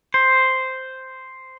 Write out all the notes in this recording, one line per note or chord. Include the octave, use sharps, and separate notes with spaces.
C5